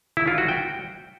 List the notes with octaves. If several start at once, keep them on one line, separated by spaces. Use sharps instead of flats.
E4
F4
F#4
G5